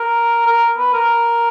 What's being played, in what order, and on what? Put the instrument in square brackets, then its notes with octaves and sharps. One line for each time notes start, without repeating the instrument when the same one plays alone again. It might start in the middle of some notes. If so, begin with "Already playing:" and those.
Already playing: [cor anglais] A#4
A#4
B4
A#4